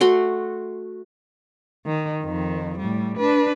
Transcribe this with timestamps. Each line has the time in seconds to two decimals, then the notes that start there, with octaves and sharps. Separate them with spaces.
0.01 A3 F#4 C6
1.86 D#3
2.24 F2 D#3
2.78 A2 G3
3.18 D4 B4